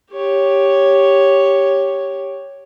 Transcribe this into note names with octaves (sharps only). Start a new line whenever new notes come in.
G4 C#5